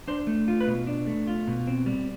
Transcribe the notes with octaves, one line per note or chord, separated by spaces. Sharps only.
D4 C5
A3
F4
B4
B2
D4
A3
F4
B2
C4
G3